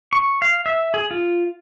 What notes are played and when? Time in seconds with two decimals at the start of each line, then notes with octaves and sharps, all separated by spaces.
0.13 C#6
0.42 F5
0.66 E5
0.94 G#4
1.11 F4